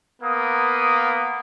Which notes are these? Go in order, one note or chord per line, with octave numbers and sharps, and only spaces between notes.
A#3 B3 D#6